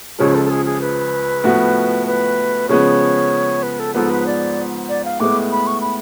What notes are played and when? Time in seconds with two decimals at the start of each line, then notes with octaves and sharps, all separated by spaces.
0.19 C#2 C#3 F3 G#3 C#5
0.35 A4
0.45 A4
0.50 G#4
0.65 G#4
0.81 B4
1.44 A2 F3 B3 F#4
2.07 B4
2.69 C#3 F3 G#3 B3 C#5
3.63 B4
3.80 A4
3.95 G#2 F3 B3 A4
4.10 B4
4.26 D5
4.89 D5
5.05 F5
5.20 A2 G#3 B3 D6
5.51 B5
5.67 C#6
5.81 B5